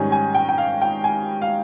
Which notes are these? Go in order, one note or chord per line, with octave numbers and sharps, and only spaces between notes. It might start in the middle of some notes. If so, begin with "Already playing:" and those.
Already playing: G#2 D#3 G3 C#4 G#5
G#5
G5
G5
F5
G5
G#5
F5